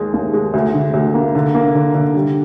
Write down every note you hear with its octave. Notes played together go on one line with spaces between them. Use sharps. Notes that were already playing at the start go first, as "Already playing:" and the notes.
Already playing: D#2 G#3
D#2
G#3
D2
D3
D2
A#3
D3
A#3
D3
D3
G3